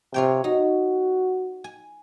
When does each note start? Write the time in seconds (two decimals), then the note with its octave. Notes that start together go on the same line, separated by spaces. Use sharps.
0.14 C3 F4 C#5 G5
0.44 D#4 F#4
1.64 G#5